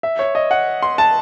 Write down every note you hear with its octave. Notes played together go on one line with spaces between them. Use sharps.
E5
C#5
D#5
F#5
C6
A5